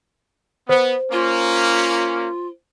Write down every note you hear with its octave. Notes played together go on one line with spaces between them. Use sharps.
B3 C5
A#3 C#4 F4